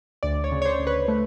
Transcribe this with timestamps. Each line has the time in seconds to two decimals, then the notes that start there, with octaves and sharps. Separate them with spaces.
0.23 D2 D5
0.44 C#5
0.52 C#3
0.62 C#5
0.65 C5
0.80 D2
0.87 B4
1.08 A3